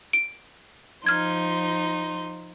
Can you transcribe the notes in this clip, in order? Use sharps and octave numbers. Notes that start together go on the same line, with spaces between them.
D7
F3 D#4 C6 F6 G#6